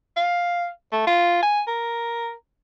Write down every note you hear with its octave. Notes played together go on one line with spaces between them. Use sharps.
F5
A3
F4
G#5
A#4